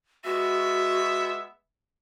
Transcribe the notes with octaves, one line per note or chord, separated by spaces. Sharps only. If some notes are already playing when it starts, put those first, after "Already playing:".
G#3 B3 F#4 E5